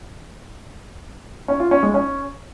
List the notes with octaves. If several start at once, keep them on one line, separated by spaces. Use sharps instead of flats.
C#4
F4
C#4
G#3
C#4